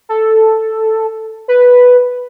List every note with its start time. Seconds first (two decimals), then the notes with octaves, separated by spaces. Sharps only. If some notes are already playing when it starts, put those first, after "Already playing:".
0.09 A4
1.48 B4